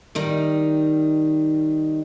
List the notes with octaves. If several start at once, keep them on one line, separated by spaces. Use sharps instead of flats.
D#3 G3 D#4